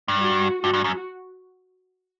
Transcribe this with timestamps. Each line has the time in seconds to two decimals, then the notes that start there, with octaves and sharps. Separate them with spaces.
0.08 G2
0.22 F#4
0.63 G2 F#4
0.74 G2
0.84 F#2